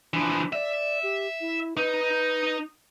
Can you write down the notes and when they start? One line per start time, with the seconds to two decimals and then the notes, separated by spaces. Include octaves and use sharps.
0.14 E3 F3 D4
0.53 D5 E5
1.03 G4
1.41 E4
1.77 D#4 B4